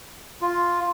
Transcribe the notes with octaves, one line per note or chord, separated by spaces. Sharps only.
F4